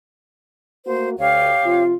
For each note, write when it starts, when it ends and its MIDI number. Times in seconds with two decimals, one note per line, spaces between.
0.86 1.17 57
0.86 1.17 58
0.86 1.17 66
0.86 1.08 72
1.18 1.51 38
1.18 1.83 67
1.18 1.83 73
1.18 1.83 77
1.64 1.93 48
1.64 1.93 53
1.64 1.93 65